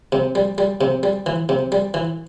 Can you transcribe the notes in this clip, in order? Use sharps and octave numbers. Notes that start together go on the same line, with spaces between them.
C3
G3
G3
C3
G3
E3
C3
G3
E3